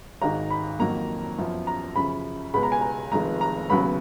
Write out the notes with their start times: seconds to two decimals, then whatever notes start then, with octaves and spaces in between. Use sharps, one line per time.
0.22 G#1 G#2 D#3 A#5
0.50 B5
0.79 F2 D#3 F#3 A#3 A#5
1.38 F#2 F3 B3
1.67 A#5
1.96 F#2 C#3 F3 B5
2.54 C#2 B2 G#3 B3 B5
2.63 A#5
2.72 G#5
2.81 A#5
3.12 F1 F2 D#3 G#3 A#5
3.41 A#5
3.70 F1 D#2 C#3 F#3 B3 B5